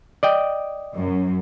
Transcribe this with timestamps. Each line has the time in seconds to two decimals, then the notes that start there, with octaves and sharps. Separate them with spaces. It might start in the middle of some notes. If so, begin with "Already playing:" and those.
0.23 D5 D#5 G5
0.95 F#2